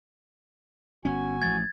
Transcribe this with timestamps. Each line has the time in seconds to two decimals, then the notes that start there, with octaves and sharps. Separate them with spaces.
1.05 G1 B3 C#4 F#4 G#5
1.42 A1 F3 A3 G#6 A6